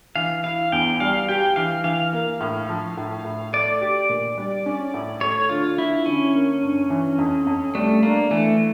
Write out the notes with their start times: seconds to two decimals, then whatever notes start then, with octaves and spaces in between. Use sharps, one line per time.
0.16 E3 F5
0.44 E4 F5
0.72 E2 G5
1.00 G3 F5
1.29 G4 G5
1.56 E3 F5
1.84 E3 F5
2.13 A#3
2.41 A2
2.69 F3
2.97 A2
3.25 A2
3.53 A3 D5
3.81 G4
4.09 A#2
4.38 G3
4.66 C#4
4.94 A2
5.21 A3 C#5
5.49 D3 F4
5.78 D3 E4
6.06 D3 C#4
6.34 A#3
6.62 G2
6.90 E3
7.19 F2
7.47 F2
7.75 G3 A3
8.03 A#3 D4
8.31 E3 A3